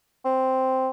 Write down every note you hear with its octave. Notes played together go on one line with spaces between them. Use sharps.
C4